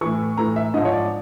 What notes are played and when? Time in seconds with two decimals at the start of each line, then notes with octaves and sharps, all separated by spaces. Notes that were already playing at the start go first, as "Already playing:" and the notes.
0.01 A2 E3 C#6
0.37 A2 E3 A#5
0.56 E5
0.74 G#2 F3 D#5
0.85 C#5
0.92 D5